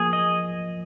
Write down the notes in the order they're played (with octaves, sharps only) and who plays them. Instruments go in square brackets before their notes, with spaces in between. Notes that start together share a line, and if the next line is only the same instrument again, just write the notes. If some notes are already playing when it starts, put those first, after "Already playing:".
Already playing: [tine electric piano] F3 A#3 [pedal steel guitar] G#4
[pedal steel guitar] D#5